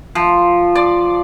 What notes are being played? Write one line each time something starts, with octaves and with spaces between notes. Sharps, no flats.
F3
D5